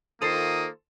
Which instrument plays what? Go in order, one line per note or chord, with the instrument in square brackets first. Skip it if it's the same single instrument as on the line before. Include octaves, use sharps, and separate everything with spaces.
[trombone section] D#3 F4 [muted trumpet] A#3 [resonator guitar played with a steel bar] A4 C5 [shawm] D#6